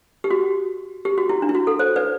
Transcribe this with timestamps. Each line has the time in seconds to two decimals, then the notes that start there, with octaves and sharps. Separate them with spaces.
0.24 G4
0.31 F#4
1.05 G4
1.18 F#4
1.29 E4
1.42 D4
1.49 E4
1.55 F#4
1.67 A4
1.79 C5
1.96 B4 D5